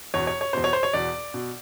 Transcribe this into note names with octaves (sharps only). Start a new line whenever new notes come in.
E2 B2 C#5
C#5
C#5
E2 B2 C5
C#5
C5
C#5
E2 B2 D5
B2